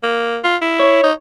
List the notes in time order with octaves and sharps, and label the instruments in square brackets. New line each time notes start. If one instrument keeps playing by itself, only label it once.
[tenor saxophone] A#3
F4
E4
[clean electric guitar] C#5
[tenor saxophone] D#4